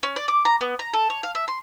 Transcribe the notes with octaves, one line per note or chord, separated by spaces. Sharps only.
C#4
D5
D6
A#5
B3
A#5
A4
C#5
F5
E5
C6